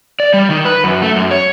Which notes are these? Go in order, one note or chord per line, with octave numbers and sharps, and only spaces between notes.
D5
G3
D#3
B4
F#2
A3
F#2
C#5